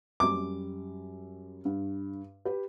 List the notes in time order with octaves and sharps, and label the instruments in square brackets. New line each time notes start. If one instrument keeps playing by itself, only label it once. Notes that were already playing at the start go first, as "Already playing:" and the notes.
[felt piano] F#2 G3 [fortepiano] D6
[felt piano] G2
G4 B4